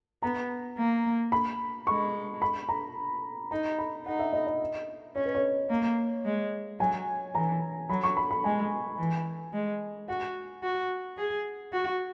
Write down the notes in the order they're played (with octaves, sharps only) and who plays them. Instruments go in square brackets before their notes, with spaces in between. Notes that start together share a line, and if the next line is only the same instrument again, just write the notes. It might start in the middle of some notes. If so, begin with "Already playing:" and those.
[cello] B3 [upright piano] A#5
[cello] A#3
[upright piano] B5
[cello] G#3 [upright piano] C#6
[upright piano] B5
A#5
[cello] D#4 [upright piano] A#5
[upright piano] B5
[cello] D#4 [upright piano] F#5
[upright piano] E5
D#5
D#5
[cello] C#4 [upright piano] C#5
[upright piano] B4
C#5
[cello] A#3
G#3
[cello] F#3 [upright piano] G#5
[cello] E3 [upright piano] A#5
[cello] F#3 [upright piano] B5
[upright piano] C#6
B5
B5
[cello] G#3 [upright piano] G#5
[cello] E3
G#3
[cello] F#4 [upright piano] F#5
[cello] F#4
G#4
F#4